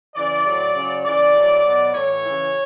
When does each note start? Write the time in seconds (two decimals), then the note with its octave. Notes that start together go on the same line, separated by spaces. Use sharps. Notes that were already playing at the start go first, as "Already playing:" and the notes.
0.16 C#3 E3 D5
0.45 A2 F#3
0.75 C#3 F#3
1.05 C#3 E3 D5
1.35 A2 F#3
1.64 B2 F#3
1.94 A2 E3 C#5
2.23 C#3 E3